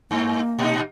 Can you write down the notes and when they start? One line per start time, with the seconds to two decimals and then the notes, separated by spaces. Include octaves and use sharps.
0.11 G2 A#3
0.59 A#2 D#4